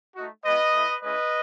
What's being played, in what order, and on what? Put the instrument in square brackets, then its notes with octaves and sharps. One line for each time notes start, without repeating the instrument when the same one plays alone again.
[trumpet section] A3 D#4 F#4
G#3 B3 E4 B4 D#5
A3 E4
G#3 C#4 E4 B4 D#5